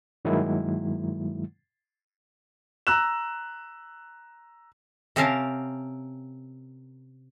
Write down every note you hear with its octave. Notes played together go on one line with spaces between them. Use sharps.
G2 D#3 F#3 G#3 A#3 E4
A#5 E6 F#6 E7
C3 C4 C#4 A#4 F5 A5